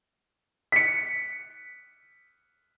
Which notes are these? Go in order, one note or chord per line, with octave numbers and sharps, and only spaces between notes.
B6 C#7